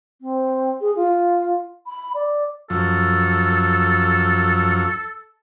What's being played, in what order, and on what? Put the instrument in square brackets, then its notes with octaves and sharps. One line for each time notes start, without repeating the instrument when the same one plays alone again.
[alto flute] C4
G#4
F4
B5
D5
[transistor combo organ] F#2 F3 [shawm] A4